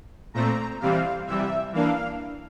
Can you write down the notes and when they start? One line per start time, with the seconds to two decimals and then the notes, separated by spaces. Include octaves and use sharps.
0.34 A#2 A3 C4 A#5
0.80 C3 E3 G3 C4 F5
1.27 C3 E3 G3 E5
1.73 E3 A#3 D4 F5